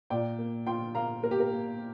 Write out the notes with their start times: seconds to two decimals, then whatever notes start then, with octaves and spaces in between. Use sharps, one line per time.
0.10 A#2 D5 G5
0.38 A#3
0.66 F4 G5 C6
0.95 A#3 F5 A#5
1.23 A#3 A#4
1.31 G4
1.40 A#4
1.51 A#3